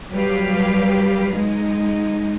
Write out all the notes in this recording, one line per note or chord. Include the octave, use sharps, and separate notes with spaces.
F#3 G3 G4 B4 F5
G#3 D#4